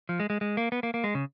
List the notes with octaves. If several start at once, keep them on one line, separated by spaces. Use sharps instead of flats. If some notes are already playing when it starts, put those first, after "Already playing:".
F3
G#3
G#3
G#3
A#3
B3
A#3
A#3
G#3
C#3